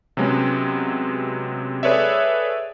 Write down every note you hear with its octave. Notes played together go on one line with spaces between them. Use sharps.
C3 F#3 G#3 B3 C#4
G#4 A4 B4 C#5 D5 E5